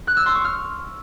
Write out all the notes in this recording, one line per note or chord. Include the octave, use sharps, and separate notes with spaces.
F#6
E6
C6
C#6
F6